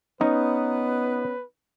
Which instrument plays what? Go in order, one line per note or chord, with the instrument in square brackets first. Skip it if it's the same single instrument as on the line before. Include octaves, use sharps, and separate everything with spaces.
[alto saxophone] B3 [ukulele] C#4 [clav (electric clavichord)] D#4 [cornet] B4